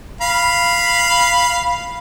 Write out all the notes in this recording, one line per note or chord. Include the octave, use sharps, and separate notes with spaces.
F5 B5